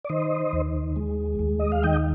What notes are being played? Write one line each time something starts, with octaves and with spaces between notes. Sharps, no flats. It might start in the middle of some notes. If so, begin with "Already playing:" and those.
D5
D#3 C5 D#5
D#2
G#3
D#2
D#5
F5
D#3 D#5 G5